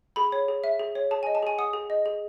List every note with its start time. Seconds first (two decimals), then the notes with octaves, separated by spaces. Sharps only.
0.16 G#4 B5
0.32 C#5
0.48 G#4
0.64 E5
0.80 G#4
0.95 C#5
1.11 G#4 A5
1.23 G#5
1.27 D#5
1.35 A5
1.43 G#4 G#5
1.58 F#5 D#6
1.73 G#4
1.90 D#5
2.06 G#4